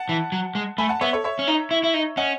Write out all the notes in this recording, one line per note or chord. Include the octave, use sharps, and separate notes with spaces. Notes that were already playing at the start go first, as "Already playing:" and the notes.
Already playing: F#5 A5
E3
F#3
G#3
A3 G#5 B5
F#5 A5
B3 C#5 E5
A4 C#5
C#5 E5
C#4
D#4
E4
E4
D#4
C#4 D#5 F#5